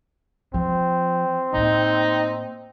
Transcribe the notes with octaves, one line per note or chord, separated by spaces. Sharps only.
F3 C4
A2 A#3 D#4